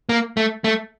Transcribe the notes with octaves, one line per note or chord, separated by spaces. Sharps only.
A#3
A3
A3